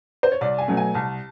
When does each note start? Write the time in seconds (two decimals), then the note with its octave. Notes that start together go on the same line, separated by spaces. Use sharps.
0.23 C5
0.32 C#5
0.41 C2 D5
0.58 G#5
0.68 B2 F#3 A3
0.77 G#5
0.94 C2 A5